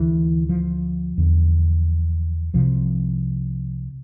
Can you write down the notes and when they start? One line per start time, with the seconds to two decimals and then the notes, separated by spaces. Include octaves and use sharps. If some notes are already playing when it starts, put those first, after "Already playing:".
Already playing: D2 D3 E3
0.49 F3
1.18 E2 D3
2.54 C2 C3 F3